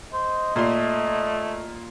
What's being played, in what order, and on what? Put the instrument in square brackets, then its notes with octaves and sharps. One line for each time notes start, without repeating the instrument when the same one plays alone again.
[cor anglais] C5 [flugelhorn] D#5
[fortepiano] A#2 C6 [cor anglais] A3